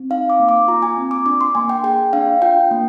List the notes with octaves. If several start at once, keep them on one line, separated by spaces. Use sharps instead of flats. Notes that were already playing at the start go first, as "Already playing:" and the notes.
Already playing: C4
D#4 F5
D6
A#3
D6
F4 A#5
G#5
C4
D6
D4 D6
C6
A#3 G#5
G5
G#4 G5
D4 F5
F4 G5
A#3